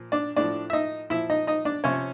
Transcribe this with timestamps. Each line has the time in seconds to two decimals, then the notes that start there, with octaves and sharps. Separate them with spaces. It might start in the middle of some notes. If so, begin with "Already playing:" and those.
Already playing: A#2 F3
0.12 D4 D5
0.36 A2 F3 D4 D5
0.70 E5
0.73 D#4 D#5
1.10 A#2 F3 E4 E5
1.30 D#4 D#5
1.47 D#4 D#5
1.65 D4 D5
1.84 C3 F3 C#4 C#5